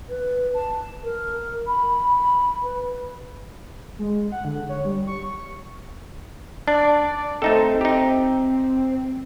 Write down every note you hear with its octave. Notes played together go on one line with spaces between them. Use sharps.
B4
A5
A#4
B5
B4
G#3
F#5
D3
C#5
G3
C#6
D4 D5
A3 C4 D#4 A4
D#4 G4